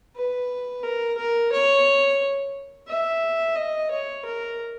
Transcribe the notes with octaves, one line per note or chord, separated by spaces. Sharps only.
B4
A#4
A#4
C#5
E5
D#5
C#5
A#4